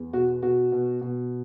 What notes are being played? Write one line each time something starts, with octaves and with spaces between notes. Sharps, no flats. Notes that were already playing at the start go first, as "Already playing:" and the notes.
Already playing: E2
B2 F#4
B2 F#4
B2
B2